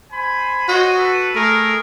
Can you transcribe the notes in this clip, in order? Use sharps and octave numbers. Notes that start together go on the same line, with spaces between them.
C5 G#5 B5
F#4 C5 C#5 D#5
A4 B4
A3 G#4 A#4